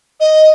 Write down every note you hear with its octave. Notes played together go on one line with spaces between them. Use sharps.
D#5